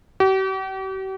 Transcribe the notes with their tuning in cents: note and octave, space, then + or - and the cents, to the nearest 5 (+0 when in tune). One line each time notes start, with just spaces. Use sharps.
G4 -45